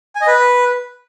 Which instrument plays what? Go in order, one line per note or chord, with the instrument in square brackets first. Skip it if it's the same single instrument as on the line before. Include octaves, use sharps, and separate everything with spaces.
[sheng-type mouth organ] G#5
D#5
B4